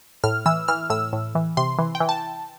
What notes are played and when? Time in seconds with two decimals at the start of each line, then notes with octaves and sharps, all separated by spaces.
0.24 A2 F6
0.46 E3 E6
0.68 E3 F6
0.90 A2 E6
1.13 A2
1.35 E3
1.57 C3 C6
1.79 E3
1.95 G5
2.00 E3
2.09 A5